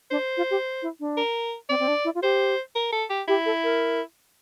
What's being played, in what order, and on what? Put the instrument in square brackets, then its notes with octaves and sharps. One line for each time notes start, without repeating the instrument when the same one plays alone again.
[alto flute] D4 [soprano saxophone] C5
[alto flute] F4
G4
E4
D4
[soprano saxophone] A#4
[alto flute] C4 [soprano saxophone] D5
[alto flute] C4
D4
E4
F4
[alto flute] G4 [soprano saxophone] C5
[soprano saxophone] A#4
A4
G4
[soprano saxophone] E4 [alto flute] G4
[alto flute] A4
A#4